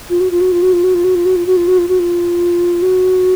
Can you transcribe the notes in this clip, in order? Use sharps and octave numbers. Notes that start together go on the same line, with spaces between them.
F4
F#4
F4
F#4
F4
F#4
F4
F#4
F4
F#4
F4
F#4
F4
F#4
F4
F#4
F4
F#4
F4
F#4